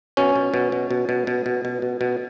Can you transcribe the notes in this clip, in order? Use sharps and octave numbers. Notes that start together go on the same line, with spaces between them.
B2 C#4
B2
B2
B2
B2
B2
B2
B2
B2
B2
B2